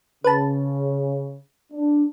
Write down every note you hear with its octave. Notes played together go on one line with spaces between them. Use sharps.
C#3 B4 A5
D4